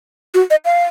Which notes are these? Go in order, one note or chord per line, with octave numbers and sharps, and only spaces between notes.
F#4
D#5
F5